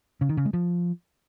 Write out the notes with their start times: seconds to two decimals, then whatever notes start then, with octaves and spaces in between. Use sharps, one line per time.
0.21 C#3
0.29 D#3
0.37 C#3
0.45 G#3
0.53 F3